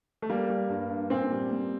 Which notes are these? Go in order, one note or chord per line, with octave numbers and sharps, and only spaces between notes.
A3
G3 A#3
G3
G2
G2
A#2 C4
G3
A#2